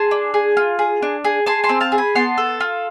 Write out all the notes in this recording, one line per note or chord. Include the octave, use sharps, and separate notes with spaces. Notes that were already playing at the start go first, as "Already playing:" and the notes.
Already playing: G#4 A5 C6
D4
G#4
F4
G#4
D4
G#4
G#4 A5 C6
A5 C6
C4
F5 A5
G#4
G#5 B5
B3 A5 C6
A4
F4